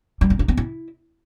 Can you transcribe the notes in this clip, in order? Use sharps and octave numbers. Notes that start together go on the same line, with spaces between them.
G3
B3
D#4
B3
E4